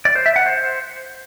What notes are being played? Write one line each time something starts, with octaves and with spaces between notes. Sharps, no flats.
D5
C5
E5
F#5
C5